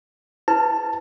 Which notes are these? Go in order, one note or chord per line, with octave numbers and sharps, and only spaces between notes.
E4 B4 A5